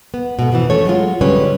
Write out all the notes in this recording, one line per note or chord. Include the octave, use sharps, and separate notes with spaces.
B3
B2 A3
F2 B2 D#3 E3
A3 C#4 A4 C#5
F#3 G#3 F4
D3 G3 G#3 C#4 B4 C#5